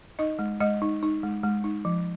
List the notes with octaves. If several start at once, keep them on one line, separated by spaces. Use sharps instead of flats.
D#4 D#5
G#3
G#3 D#5
D#4
D#4
G#3
G#3
D#4
F3